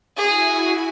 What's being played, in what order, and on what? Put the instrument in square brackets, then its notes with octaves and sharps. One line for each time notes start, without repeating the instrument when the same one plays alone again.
[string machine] E4 F#4 G#5 [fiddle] G#4